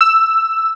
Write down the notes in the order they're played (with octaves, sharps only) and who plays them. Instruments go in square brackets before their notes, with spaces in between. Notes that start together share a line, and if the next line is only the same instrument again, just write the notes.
[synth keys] E6